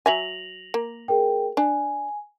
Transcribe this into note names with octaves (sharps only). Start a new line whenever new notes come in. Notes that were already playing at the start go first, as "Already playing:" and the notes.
F#3 E5 G#5 A#6 F7 F#7
A#3
G#4 A#4 G5
D4 G#5